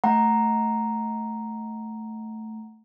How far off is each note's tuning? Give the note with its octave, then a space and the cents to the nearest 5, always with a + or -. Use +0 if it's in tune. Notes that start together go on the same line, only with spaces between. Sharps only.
A3 +0 F#5 +0 A#5 +0